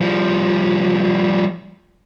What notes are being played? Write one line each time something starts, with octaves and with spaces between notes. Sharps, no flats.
F3 G3